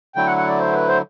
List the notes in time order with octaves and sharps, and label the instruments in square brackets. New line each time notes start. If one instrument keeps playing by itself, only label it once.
[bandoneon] D3 F#3 A3 E4 [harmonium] G5
[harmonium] F#5
F#5
D5
C5
B4
C5